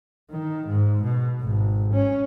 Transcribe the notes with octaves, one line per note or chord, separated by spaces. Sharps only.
D#3
G#2
B2
G#1
C#4